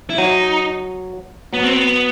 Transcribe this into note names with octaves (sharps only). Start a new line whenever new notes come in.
E4
F#3 D#4
F#3 B3
C4
B3